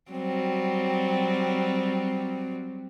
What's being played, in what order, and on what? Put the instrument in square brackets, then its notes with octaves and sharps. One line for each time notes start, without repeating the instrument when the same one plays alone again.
[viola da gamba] F#3 G3 C4